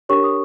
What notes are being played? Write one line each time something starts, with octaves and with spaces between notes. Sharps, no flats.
D4 G4 A#4 C#5 C#6
D#6